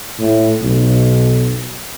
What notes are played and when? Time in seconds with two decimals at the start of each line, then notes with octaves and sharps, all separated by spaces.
0.19 A2
0.62 B1